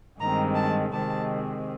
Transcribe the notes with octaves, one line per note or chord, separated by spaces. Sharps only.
G2 D#3 G#3 C4 A#5
A5
C3 D#3 G#3 C4 A5